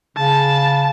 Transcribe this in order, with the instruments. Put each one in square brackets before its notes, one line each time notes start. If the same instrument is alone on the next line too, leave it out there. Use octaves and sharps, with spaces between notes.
[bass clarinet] C#3 [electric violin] A5